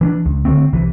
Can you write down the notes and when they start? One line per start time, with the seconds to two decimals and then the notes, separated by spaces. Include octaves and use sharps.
0.01 E3 C#4 D4
0.25 C#2
0.45 D3 A3 C4
0.73 C2 C3 E3